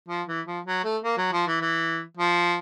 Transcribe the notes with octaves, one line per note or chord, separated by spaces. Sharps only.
F3
E3
F3
F#3
A3
A#3
F#3
F3
E3
E3
F3